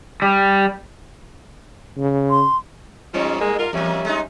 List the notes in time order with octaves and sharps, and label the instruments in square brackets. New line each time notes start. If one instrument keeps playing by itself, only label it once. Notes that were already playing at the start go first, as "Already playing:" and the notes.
[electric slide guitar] G3
[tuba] C#3
[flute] C6
[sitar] G#2 G3 [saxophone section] F3 C#4
[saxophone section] G#3 A#3 G#4
F4 A#4
[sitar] E2 A#3 [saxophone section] G3 C#4 E5
[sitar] G#3 D#4